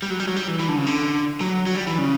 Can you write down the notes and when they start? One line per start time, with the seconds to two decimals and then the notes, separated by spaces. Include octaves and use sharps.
0.02 G3
0.10 F#3
0.20 G3
0.28 F#3
0.36 G3
0.48 E3
0.60 E3
0.68 D3
0.77 C#3
0.86 D3
1.41 F#3
1.66 F#3
1.75 G3
1.87 E3
1.98 C#3